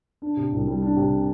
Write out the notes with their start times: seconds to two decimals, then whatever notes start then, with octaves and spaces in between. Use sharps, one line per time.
0.22 D4
0.37 C3
0.52 C2
0.67 G3
0.82 D4
0.97 C3